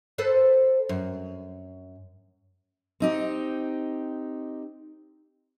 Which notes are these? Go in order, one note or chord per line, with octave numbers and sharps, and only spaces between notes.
A4 B4 C5
F#2
C4 D#4 G4